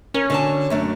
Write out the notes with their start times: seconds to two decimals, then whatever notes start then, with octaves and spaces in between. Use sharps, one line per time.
0.14 C#4 A#4
0.30 D3 F#4 A5
0.70 F#2 A3 D4